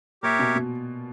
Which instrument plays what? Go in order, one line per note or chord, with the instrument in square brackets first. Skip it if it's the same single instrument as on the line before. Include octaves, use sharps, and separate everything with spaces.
[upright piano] A#2 [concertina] G4 A#4 C#5 E5
[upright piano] B2
B2